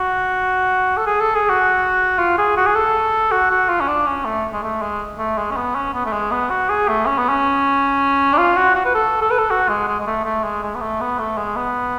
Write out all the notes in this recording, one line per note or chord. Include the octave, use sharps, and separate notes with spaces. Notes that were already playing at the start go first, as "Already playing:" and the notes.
Already playing: F#4
A4
G#4
A4
G#4
F#4
F4
G#4
F#4
G#4
A4
F#4
F#4
F4
C#4
D4
C#4
A3
G#3
A3
G#3
A3
G#3
C#4
B3
C#4
B3
A3
G#3
B3
F#4
G#4
A3
C#4
B3
C#4
D4
F4
F#4
F#4
B4
A4
A4
B4
A4
F#4
G#3
G#3
G#3
A3
A3
G#3
G#3
B3
A3
B3
A3
G#3
B3